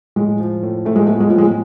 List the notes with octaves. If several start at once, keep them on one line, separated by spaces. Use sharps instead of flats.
A2 G#3
F3
A2
A2 A3
G#3
A3 B3
G#3
A2 F3
G#3